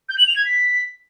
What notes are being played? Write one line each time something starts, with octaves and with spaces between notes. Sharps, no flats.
G6
F#7
F7
G#6
B6